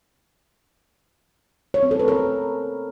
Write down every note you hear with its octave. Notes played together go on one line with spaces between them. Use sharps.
C#5
C4
A4
B4
A#4